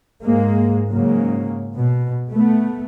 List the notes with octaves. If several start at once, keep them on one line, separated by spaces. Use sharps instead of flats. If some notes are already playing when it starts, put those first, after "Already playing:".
G#2 G#3 A#3
G#2 C#3 F#3 A#3
B2
A3 B3